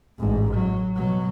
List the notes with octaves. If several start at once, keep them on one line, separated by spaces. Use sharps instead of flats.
A1 G#2
F#3
B2 F#3